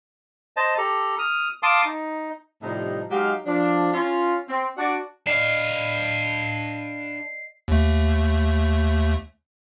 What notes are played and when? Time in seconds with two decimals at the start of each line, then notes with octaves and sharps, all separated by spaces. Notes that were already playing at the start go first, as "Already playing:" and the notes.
0.57 C5 D#5 A5
0.78 G4 A4 A#5
1.19 D#6 F6
1.63 F5 A5 C6 D6 D#6
1.85 D#4
2.61 A2 C3 F3 G3 D#4 D#5
3.10 F#3 G#3 D#4 G4 F5
3.45 F3 D4
3.92 C#4 F4
4.47 C4
4.77 D4 F#4 D5
5.27 D4 D5 D#5 F5 C7
7.68 D#2 A3